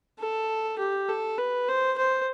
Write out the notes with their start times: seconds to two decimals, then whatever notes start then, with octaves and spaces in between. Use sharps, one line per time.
0.19 A4
0.79 G4
1.09 A4
1.38 B4
1.69 C5
1.98 C5